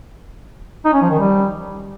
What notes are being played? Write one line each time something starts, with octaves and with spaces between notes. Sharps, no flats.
D#4
C#4
F3
D#3
G3